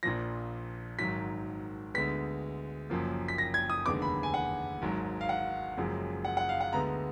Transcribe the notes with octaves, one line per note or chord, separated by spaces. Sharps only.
A#1 A#2 F3 A#6
G#1 G#2 D#3 F#3 B6
D2 D3 G#3 B3 B6
F#1 F#2 F3 A#3
B6
A#6
G#6
D#6
F1 D#2 D3 G#3 B3 D6
B5
G#5
F#5
G#1 G#2 F#3
F5
F#5
F#1 F#2 F3 G#3
F#5
F#5
F5
F#5
D2 D3 G#3 B3 A#5